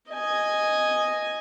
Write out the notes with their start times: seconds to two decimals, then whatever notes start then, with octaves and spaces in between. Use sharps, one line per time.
0.11 D#5 G#5